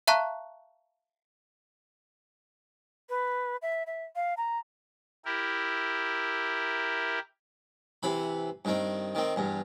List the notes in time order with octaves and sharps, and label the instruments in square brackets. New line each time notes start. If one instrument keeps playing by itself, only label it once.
[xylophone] E5 F5 A5 A#5 C#6 F#6
[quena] B4
E5
E5
F5
A#5
[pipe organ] E4 G4 A#4
[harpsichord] C3 E3 B5
G2 D#3 C4
D#3 C4
E2 G2